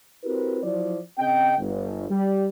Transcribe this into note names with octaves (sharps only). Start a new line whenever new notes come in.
C4 E4 F#4 G4 A#4 B4
F3 F#3 E4 D5
C#3 C4 D#5 G5
G1
G3